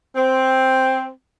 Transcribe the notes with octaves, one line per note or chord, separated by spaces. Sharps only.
C4